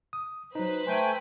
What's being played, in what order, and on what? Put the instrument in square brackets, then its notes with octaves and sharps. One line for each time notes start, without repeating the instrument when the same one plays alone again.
[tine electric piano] D#6
[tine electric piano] F#3 D#4 [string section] B4 C5 B5
[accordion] A3 G5 G#5 [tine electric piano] A#5 C6